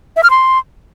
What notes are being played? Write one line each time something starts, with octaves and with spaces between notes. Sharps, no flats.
E5
F6
C6